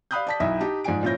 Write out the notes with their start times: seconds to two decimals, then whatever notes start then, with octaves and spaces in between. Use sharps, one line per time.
0.11 D5 F5 B5 D#6 F#6 G6
0.27 D5 A5 B6
0.40 B1 D#4 E4 E5
0.60 D#4 G4 A5
0.84 G#2 F3 D5 G#5 D7
1.03 A#2 F3 C#4 E4 G6 A#6